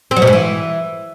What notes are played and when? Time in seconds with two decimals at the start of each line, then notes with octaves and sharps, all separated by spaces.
0.11 C4
0.16 F#3
0.22 B2
0.27 G#2
0.33 E3